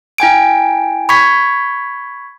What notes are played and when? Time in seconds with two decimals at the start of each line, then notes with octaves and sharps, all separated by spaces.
0.18 E4 G5 G#5 D7
1.09 B5 C#6 G#6 B6